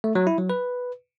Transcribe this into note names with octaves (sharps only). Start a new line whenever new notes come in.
A3
F#3
E4
F#3
B4